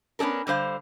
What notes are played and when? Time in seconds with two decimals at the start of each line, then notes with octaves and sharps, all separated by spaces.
0.19 B3 C#4 D4 A4 A#4
0.47 D3 G3 C5 F5